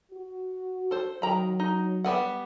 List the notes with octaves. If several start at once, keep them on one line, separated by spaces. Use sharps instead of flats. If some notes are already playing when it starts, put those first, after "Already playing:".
F#4
A4 C5
D#3 F#3 A#5 B5
D#4
G3 B3 F#5